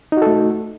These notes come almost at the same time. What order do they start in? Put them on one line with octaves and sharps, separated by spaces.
D#4 F#4 A4 A3